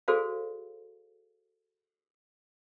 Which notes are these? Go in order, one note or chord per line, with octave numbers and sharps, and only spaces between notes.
F#4 G#4 A4 C5 D5 F5